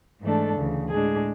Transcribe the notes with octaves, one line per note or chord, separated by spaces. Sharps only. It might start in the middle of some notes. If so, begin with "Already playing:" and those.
G#2 E3 A3 D4 A4
D2 C#3 E3
A2 G#3 D4 G#4